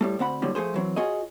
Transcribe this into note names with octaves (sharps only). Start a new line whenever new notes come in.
A2 G3 A3
D2 C4 F#5 B5
D#2 A2 D3 F#3 G3
F3 A3 G#4 C5
E3 F#3 C4
F4 F#4 G#4 C#5 D#5